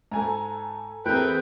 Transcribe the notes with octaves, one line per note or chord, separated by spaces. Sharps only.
G#2 A4 G#5 A#5
E2 E3 A3 C4 G#4 A#4 B4 G5